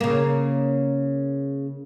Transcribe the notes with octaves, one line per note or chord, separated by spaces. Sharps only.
C#3 A#3